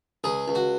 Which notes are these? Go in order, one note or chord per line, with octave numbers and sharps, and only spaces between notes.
C#2 G#4
C#2
F#4